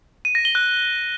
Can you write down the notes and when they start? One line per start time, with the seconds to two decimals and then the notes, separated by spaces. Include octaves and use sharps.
0.25 D#7
0.35 A#6
0.45 G7
0.55 F#6